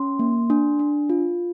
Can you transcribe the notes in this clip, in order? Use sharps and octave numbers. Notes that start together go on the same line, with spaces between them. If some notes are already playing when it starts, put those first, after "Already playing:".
Already playing: C#4 C6
A#3
D4
D4
F4